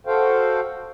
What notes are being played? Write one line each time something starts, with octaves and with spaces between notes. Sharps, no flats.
F#4 A4 C5 F5 G5